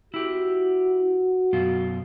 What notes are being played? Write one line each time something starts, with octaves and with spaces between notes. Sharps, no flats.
E4 F#4 G4
F#2 B2 F4